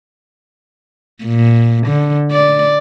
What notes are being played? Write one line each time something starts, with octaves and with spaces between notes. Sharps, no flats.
A#2
D3
D5